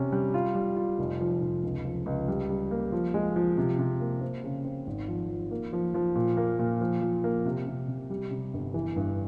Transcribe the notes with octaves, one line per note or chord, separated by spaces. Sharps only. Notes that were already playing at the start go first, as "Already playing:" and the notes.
Already playing: C3 C#4
G3
F4
G3
F4
F1
F3
F1
C#2
F3
C#2
G3
G3
A#3
F3
G#3
F3
C3
C3
A#3
C4
C#3
C4
G#1
F3
F3
A#3
F3
F3
A#2
A#3
A#2
F3
F3
A#3
C3
C3
C3
G3
C3
G1
E3
G2